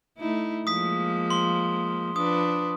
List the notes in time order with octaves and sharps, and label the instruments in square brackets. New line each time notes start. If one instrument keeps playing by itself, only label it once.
[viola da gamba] A3 D#4 E4
[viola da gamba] F3 G#3 A#3 [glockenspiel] D#6 B6
[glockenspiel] C6 G7
[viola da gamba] F3 D4 B4 [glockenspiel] D#6